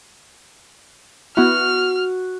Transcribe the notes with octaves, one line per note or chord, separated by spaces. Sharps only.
B3 E4 F#4 F6